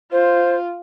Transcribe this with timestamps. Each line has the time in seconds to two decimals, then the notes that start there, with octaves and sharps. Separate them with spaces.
0.12 F4 C5